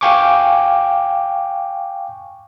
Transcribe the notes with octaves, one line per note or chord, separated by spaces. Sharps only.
F5 G5 G#5 C#6 D6